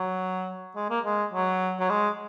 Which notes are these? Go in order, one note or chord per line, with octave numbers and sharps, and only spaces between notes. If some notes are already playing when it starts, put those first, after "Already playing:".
Already playing: F#3
G#3
A#3
G#3
F#3
F#3
G#3